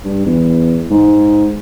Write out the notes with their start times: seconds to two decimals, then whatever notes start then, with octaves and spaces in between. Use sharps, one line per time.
0.04 G2
0.26 E2
0.90 G#2